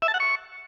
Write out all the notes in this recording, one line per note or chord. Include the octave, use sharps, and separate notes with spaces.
E5
A5
F#5
C#6